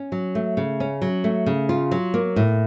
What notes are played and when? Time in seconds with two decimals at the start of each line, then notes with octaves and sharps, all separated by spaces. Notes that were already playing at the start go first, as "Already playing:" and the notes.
Already playing: C#4
0.12 F#3
0.35 A3
0.57 C#3
0.80 C#4
1.02 F#3
1.24 A3
1.46 C#3
1.69 F4
1.91 F#3
2.14 A#3
2.36 A2